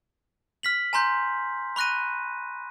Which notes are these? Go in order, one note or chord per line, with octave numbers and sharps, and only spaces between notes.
F6 B6 F#7
G#5 A#5 C6 G6
B5 C#6 F#6 A#6 D#7